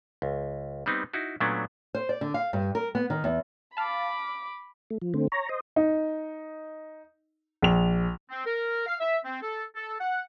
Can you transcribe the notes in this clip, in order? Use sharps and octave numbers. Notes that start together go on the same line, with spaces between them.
C#2
G3 B3 C4 D#4
D#4 E4 F#4
A#2 F#3 A3 B3 C#4 D4
C5
D5
D3
F5
G2
A#4
B3
D#3
E2
F5 A5 B5 D6
A3
F3
D3 A3 C4
C#5 A#5
C5 D#5
D#4
A#1 F7
C4
A#4
F5
E5
C4
A4
A4
F#5